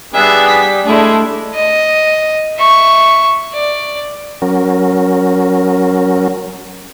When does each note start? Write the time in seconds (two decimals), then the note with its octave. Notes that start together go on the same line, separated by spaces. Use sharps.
0.14 G3 B3 D4 G#4 E5
0.48 B6
0.86 G#3 A3 D4 E4 G#4
1.54 D#5
2.57 E5 C#6
3.54 D5
4.42 F#3 C#4 A#4